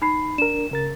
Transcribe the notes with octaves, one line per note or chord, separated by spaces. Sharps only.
D#4 B5 C7
D4 A#4 E7
C#3 A#4 A6